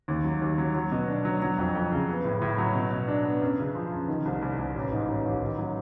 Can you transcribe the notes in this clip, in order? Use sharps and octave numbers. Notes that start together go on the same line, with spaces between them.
D#2
F#3
D#2
F#3
F#3
B2
D4
F#3
F#3
F2
F2
C#3
B3
A2
A2
F#3
B2
B2
D4
B3
F#2
C#3
F3
F#2
D#3
C2
C2
C2
A1
G#2
A1
A1
D#3
F#3